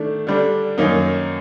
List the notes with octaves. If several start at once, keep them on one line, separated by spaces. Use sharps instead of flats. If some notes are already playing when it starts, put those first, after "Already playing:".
Already playing: D#3 A3 D4
D3 G3 D4
F#2 D#3 F#3 A#3 D#4